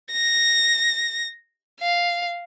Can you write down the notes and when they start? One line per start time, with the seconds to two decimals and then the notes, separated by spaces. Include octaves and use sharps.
0.12 A#6
1.80 F5